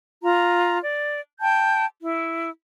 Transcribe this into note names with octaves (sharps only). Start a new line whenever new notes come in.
F4 A#5
D5
G5 A5 G6
E4